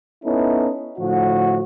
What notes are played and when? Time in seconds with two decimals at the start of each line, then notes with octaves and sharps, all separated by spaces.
0.24 B3 C#4 D#4 E4 A4
0.99 A2 D3 F3 F#4